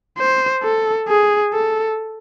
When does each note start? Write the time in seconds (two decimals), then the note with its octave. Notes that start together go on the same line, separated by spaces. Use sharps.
0.18 C5
0.63 A4
1.08 G#4
1.53 A4